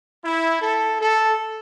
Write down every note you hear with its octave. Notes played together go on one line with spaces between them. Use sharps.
E4
A4
A4